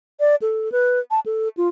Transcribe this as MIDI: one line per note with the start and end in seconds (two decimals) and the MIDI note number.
0.20 0.35 74
0.42 0.72 69
0.72 1.00 71
1.11 1.20 81
1.26 1.48 69
1.57 1.69 65